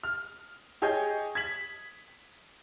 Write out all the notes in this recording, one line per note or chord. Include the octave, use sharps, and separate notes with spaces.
F6
G4 G#4 C#5 D#5 G6
G#6 B6 F#7